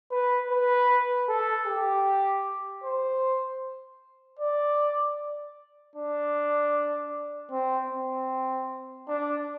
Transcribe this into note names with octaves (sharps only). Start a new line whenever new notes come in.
B4
B4
A4
G4
C5
D5
D4
C4
C4
D4